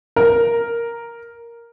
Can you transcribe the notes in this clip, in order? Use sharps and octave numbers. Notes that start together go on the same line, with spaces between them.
A#4